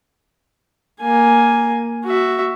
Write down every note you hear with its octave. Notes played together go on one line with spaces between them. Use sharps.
A#3 G#5
F#4 E5